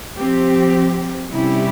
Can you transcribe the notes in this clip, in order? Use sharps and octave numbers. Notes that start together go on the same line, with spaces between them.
F3 C4 G4
C3 G3 C#4 E4 G4